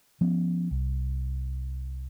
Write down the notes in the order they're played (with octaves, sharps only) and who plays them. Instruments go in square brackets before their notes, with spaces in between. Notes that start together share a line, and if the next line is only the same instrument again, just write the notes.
[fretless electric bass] F3 B3 C#4
C2